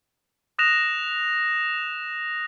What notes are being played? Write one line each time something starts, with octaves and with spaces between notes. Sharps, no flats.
D#6 F#6 A#6 E7 F7